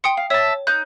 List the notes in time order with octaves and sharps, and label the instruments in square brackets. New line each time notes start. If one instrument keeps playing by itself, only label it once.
[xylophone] G5 D#6 C#7 [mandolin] C6
[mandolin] F5
[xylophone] C#5 [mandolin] E5 A5
[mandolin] D#4 G6 [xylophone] F#6